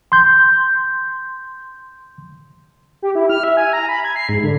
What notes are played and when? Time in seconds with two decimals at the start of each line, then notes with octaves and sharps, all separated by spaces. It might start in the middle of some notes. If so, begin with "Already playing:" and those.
0.12 C6 G6
3.02 G4
3.15 E4
3.30 F6
3.44 E5
3.57 G#5
3.73 A#5
3.89 B5
4.05 G#6
4.16 C7
4.29 G#2
4.43 D3